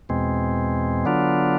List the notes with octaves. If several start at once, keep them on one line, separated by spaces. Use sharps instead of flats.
E2 B2 G#3 C4
D3 F#3 B3 D4 F4